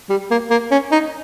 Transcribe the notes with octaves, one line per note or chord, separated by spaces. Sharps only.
G3
A#3
A#3
C#4
D#4